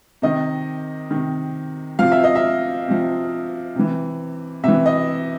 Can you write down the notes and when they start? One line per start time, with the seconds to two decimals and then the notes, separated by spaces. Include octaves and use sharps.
0.22 C3 D#3 D#5
1.11 C3 D#3
1.99 C3 F3 F5
2.12 E5
2.24 D#5
2.35 E5
2.88 C3 F3
3.75 C3 E3
4.63 C3 E5
4.68 E3
4.86 D#5